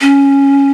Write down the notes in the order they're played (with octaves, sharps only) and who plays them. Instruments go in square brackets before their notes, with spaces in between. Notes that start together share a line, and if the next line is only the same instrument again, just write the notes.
[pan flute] C#4